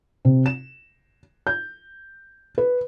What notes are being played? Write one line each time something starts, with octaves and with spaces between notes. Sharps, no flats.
C3
E7
G6
B4